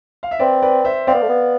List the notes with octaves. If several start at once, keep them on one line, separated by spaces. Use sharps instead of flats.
F5
E5
C4 B4 D5
B4 D5
C5 E5
C4 D5 F5
B3
A3
B3